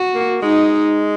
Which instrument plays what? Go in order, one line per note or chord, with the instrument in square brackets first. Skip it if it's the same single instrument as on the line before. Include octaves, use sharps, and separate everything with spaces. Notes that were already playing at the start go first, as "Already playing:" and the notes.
Already playing: [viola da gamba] F#4
[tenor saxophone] A#3
[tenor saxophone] G#3 [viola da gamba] D#4